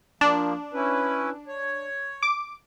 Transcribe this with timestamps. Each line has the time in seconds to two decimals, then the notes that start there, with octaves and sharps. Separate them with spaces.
0.21 F3 A#3 D4
0.73 C#4 E4 B4
1.48 C#5
2.23 D6